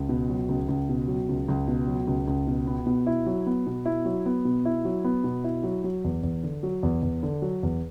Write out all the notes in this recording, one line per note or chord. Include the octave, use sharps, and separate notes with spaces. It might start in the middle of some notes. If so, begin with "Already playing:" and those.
Already playing: C#2
B2
F#3
C#2
C#2
B2
F#3
C#2
C#2
B2
F#3
C#2
C#2
B2
B3
B2
E4
F#3
B3
B2
E4
F#3
B3
B2
E4
F#3
B3
B2
E4
F#3
F#3
E2
E2
D3
F#3
E2
E2
D3
F#3
E2